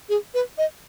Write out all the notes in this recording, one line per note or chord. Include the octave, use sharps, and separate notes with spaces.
G#4
B4
D#5